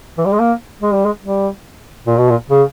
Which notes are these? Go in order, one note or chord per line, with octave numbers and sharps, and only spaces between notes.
E3
G3
G#3
A#3
G#3
G3
G#3
G3
A#2
B2
A#2
C#3